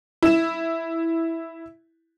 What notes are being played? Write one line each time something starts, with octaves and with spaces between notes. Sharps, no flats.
E4 E7